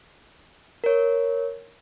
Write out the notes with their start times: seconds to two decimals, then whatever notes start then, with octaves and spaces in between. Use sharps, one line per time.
0.84 A#4 C#5